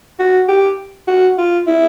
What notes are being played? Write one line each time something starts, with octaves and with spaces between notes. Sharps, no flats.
F#4
G4
F#4
F4
E4